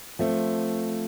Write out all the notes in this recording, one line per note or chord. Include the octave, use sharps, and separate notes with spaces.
F3 A3 C4